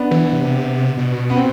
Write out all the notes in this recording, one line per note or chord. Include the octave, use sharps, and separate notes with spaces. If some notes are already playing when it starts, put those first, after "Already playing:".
Already playing: B3 D4
E3
C3
B2
B3
C4